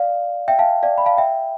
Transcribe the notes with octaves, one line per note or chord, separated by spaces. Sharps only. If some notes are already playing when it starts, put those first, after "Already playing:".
Already playing: D5 F5
E5 G5
F5 A5
D5 F5
B5
F5 A5
E5 G5